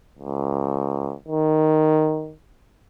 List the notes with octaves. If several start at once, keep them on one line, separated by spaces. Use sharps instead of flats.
C#2
D#3